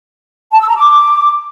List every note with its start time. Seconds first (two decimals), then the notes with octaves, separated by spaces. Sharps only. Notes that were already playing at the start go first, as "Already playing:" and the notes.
0.52 A5
0.60 E6
0.68 A#5
0.76 D6